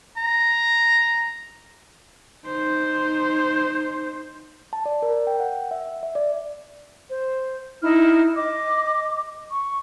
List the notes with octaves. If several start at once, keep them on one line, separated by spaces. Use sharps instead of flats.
A#5
D#4 C5
A5
D5
A#4
G5
F#5
E5
E5
D5
C5
D#4 E4 F6
D#5 D6
C#6